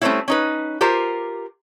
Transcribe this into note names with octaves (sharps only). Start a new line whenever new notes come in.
G3 A3 A#3 C4 C#4 E4
C#4 D#4 B4
F4 G4 A#4 C5